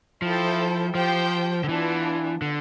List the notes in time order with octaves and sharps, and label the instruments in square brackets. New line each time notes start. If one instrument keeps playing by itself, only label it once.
[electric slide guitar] F3 [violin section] E4 A4 C5 G5
[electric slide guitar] F3 [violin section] G4 C5 G5
[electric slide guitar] D3
[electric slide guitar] E3 [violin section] B3 D4 F4
[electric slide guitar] D3